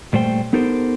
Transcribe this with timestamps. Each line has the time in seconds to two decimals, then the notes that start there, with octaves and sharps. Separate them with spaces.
0.13 A#2 G3 A3 C5 G5
0.53 B3 D#4 G4 A4 A#4 C5